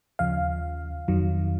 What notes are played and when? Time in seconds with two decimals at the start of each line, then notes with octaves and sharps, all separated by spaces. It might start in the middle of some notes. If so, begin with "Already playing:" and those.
0.19 D#2 C#3 F3 F5
1.08 F2 D#3 F#3